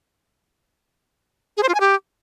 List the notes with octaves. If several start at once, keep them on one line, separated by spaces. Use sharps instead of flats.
G#4
C5
F4
G#5
G4